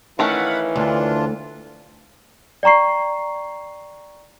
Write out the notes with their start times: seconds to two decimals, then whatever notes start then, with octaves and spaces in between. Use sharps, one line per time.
0.19 D#3 E3 A3 C#4 F5 F#5 B5
0.76 D2 D4 F4
2.63 D5 G5 A#5 C#6 C7